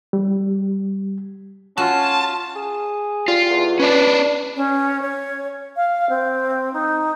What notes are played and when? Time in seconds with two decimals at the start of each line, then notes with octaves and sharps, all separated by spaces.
0.13 G3
1.78 C#4 F4 F#4 A5
2.56 G#4
3.28 G3 F4
3.50 E2
3.80 C#4 D4 B4 D5
4.56 C#4
5.01 C#5
5.76 F5
6.09 C4
6.73 D#4